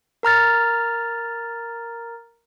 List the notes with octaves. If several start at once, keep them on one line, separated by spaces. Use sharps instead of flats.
A#4 A#5 F6 A6